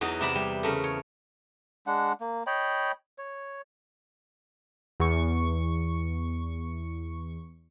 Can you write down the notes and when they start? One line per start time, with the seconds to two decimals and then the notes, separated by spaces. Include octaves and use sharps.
0.01 E2 E3 F#3 D#4
0.21 C3 E4 D5 E5 A#5 B5
0.35 G3
0.63 C#3 A3 A#4 B5
0.84 C#5
1.87 G#3 D4 F#5
2.21 A#3
2.47 C#5 D#5 G5 B5
3.18 C#5
5.00 E2 C#6